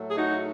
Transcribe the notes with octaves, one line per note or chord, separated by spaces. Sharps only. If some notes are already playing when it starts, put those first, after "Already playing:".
Already playing: A2 F#3 A3
G#4
D#4 F#4